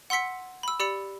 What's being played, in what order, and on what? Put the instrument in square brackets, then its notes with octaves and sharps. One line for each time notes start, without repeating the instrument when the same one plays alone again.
[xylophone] F#5 C6 E6 B6 C#7
B5 E6
G4 D5 B5 E6 C#7